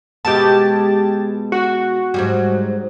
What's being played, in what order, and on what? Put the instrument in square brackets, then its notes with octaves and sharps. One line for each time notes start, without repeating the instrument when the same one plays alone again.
[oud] B2 G#3 B3 [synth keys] G4 A5
[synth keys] F#4
[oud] G#2 F#3 G3